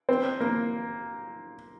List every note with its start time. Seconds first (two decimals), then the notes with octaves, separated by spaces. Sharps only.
0.09 C4
0.40 A#3